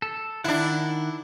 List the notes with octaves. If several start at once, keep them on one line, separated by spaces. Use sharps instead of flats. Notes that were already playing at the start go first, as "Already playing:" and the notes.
A4
D#3 D4 E4 F#5